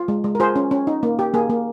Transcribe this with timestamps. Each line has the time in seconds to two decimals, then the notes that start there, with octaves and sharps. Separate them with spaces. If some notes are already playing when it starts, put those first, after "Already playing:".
Already playing: F4
0.08 G#3
0.24 G#3
0.35 A#4
0.40 F4 G#4 C5
0.56 C#4
0.71 C#4
0.87 D#4
1.03 A#3
1.19 G4
1.34 A#3 G#4
1.50 A#3